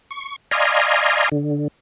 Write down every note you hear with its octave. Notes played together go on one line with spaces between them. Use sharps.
C#6
D5 D#5 F5 G#5 A#5 C6
D3